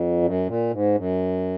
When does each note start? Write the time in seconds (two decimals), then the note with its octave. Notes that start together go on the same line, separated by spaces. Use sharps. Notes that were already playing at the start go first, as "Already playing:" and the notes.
Already playing: F2
0.22 F#2
0.46 A#2
0.71 G#2
0.95 F#2